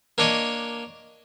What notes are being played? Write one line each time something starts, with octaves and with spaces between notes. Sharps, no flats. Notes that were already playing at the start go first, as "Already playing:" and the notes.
A#3 D4 C#5 D#5